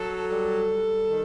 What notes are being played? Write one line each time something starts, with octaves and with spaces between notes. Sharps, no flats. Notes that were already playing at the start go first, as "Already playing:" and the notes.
Already playing: F#3 A4
G3 A4
G3
D#3